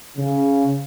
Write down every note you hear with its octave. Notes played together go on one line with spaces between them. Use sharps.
C#3